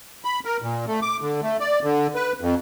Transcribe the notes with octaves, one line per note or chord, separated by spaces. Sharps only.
B5
A#4
A#2
A3
D6
D3
A3
D5
D3
B4
F2